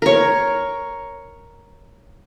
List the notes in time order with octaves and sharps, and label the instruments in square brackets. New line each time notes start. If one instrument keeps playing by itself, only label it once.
[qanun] A#4 C#5